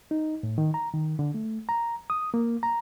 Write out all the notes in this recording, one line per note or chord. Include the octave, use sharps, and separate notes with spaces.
D#4
A2
D#3
A#5
D#3
D3
A3
A#5
D#6
A#3
A#5